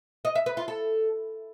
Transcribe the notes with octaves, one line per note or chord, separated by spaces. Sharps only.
D#5
E5
B4
F4
A4